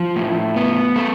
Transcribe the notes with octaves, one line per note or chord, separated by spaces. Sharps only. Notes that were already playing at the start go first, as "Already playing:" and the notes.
Already playing: F3
A2
B3
A3